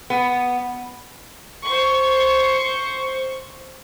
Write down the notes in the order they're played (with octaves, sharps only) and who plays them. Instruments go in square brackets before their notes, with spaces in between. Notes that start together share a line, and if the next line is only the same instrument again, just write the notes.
[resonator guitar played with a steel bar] B3
[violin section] C5 C#6